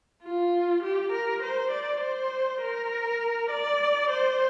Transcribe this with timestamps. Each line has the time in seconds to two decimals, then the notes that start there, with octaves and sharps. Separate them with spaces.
0.23 F4
0.83 G4
1.12 A#4
1.42 C5
1.71 D5
2.01 C5
2.61 A#4
3.51 D5
4.10 C5